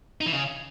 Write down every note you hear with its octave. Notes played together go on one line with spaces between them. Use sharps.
D#4
E3
C#3